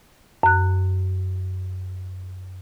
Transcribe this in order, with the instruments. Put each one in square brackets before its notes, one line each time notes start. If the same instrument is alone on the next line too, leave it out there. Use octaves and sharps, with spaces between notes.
[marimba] F#2 F#6